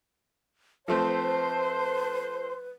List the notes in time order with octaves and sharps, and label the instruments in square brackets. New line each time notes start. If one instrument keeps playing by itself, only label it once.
[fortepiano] F3 A3 C4 [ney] B4 [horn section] C5 [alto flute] A5